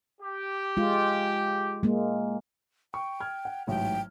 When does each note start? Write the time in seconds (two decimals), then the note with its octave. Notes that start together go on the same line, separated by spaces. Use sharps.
0.21 G4
0.77 G#3 F4
1.83 G#3 A#3
2.94 G5 C#6
3.20 F6 G#6
3.45 F#5
3.67 A1 G#2 F#3 G5